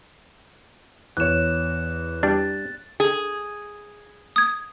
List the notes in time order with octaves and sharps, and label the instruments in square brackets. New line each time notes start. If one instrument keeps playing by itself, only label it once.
[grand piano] E2 C#5 [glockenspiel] F#6 E7
[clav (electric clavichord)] G3 D4 [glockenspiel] A6
[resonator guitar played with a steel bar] G#4
[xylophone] D#6 G#6